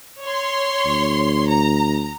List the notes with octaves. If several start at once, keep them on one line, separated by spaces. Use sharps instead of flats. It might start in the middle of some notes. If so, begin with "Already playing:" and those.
C#5 C6
D2
A#5